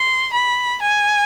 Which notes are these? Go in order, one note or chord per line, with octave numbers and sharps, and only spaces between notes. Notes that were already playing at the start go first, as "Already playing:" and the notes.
Already playing: C6
B5
G#5